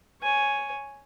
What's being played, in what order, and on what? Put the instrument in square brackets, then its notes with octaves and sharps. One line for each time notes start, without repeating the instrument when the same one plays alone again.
[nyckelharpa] C#5 G#5